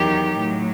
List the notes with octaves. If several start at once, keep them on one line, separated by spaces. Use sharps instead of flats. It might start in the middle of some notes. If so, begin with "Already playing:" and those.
Already playing: E2 D#3 F#3 G4
A2 F#3